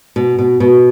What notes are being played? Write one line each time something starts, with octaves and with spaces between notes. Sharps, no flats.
B2
B2
B2